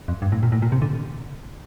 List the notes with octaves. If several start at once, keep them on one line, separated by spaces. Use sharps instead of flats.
F2
G2
A2
A#2
A2
A#2
C3
D3